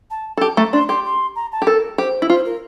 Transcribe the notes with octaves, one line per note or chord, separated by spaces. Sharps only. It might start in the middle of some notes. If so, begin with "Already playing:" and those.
A5
A4
G4 A5
A3 A#5
D4 C6
G4 C6
C6
A#5
A5
G4
A4 A#4
G4 C5
E4
F4 C5
A#4